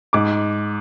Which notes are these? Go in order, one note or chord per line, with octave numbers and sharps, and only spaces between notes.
G#2 D6